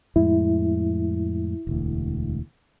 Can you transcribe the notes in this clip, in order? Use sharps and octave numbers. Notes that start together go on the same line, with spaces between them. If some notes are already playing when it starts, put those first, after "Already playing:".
F2 A2 G#3 E4
E1 D2